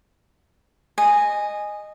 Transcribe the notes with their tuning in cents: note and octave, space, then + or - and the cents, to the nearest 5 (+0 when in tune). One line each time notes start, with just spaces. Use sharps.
D#5 -15 G#5 -5